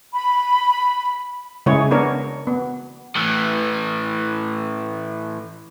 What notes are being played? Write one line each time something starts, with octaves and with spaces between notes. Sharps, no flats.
B5
C#3 G#3 E4 G#4 C#5
B3 D4 A#4 C#5
B3
A2 E3